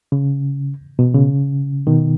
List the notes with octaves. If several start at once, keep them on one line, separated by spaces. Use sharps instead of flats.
C#3
B2
C#3
B2 D#3